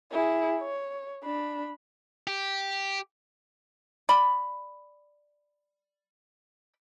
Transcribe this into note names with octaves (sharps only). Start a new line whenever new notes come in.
E4 G#4
C#5
D4 B5
G4
D5 B5